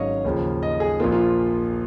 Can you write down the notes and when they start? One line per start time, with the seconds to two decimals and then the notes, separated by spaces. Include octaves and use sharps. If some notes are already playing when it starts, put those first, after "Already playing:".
Already playing: G#1 G#2 F#3 C#4 C#5 D#5 F5
0.24 D#2 C#3 F3
0.63 D#5
0.80 G#4
1.00 A#1 A#2 F3 A#3 F4
1.12 F4